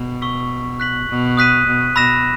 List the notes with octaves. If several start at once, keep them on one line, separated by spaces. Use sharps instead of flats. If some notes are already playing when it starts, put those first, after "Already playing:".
Already playing: B2
C#6 E6 B6
F#6 B6 F#7
B2
D#6 F#6 B6 D#7
B2
B2 B5 E6 A#6 E7